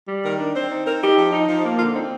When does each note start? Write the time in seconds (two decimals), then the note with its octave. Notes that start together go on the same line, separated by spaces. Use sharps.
0.08 G3
0.24 D#3 A#4
0.39 D4
0.55 C4 C5
0.71 D#4
0.86 C4 A#4
1.01 D#4 G4
1.17 F3
1.33 D#4
1.48 F3
1.65 A#3
1.79 D3 F4
1.95 C4 D#4